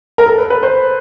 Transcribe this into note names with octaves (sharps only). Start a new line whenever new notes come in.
A#4
A4
B4
B4
C5